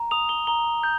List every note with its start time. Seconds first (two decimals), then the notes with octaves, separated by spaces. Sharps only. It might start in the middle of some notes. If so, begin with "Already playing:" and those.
Already playing: A#5
0.11 D#6 F7
0.29 G7
0.47 A#5 G7
0.83 G6